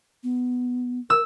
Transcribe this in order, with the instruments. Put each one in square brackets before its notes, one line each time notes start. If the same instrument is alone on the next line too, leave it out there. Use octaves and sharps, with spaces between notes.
[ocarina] B3
[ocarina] A#4 [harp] E6